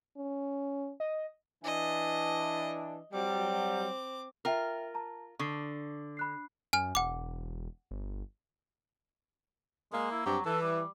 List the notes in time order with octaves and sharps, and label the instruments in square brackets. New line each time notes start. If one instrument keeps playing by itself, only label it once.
[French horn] C#4
[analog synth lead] D#5
[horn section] E3 D4 [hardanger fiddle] D#5
[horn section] F#3 G3 [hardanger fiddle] C4 D6
[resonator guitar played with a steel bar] F4 A#4 [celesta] E5 G5 F6
[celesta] A5 A#5
[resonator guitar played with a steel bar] D3 [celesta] C#6 D#6 C7
[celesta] B5 F#6 C7
[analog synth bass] F#2 [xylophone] G#5 F6
[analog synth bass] E1 [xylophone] F#5 D6
[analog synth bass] G1
[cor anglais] G#3 [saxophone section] A#3
[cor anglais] E4
[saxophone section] G2 C4 G4 [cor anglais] F#3
[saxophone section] E3 [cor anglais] A4
[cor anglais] G3